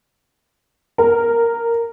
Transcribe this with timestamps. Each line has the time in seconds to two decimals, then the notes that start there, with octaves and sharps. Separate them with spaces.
0.98 A#4